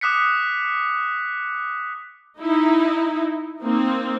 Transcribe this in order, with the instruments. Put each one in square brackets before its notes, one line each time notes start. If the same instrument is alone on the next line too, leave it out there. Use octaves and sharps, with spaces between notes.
[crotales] D6 D#6 F#6 B6 C#7
[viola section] D#4 E4
A#3 C4 D#4